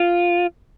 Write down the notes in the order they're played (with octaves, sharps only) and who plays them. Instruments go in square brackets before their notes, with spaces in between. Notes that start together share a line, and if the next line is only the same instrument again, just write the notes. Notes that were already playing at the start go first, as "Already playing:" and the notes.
Already playing: [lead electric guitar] F4